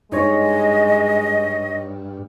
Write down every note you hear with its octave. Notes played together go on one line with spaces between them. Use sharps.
G2 G#3 D#4 C#5 D#5